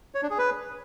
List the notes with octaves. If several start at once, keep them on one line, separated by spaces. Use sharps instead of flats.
C#5
D4
G#4
B4